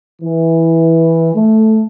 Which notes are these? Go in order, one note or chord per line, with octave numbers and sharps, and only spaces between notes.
E3
A3